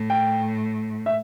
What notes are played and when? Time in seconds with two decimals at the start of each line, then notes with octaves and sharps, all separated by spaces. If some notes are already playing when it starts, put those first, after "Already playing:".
Already playing: A2
0.10 G5
1.06 E5